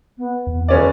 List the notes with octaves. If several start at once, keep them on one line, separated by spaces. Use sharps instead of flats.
B3
E2
E1 C#4 B4 D5